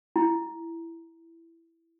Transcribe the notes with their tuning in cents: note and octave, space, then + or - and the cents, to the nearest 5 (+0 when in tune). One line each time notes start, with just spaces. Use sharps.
E4 +10